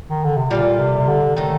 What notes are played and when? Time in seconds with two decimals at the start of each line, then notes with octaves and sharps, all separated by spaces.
0.10 D#3
0.24 D3
0.37 C3
0.51 A#2 G3 A#3 F4 A4
0.79 C3
0.98 C3
1.08 D3
1.36 A2 D#3 A3 D#4 A4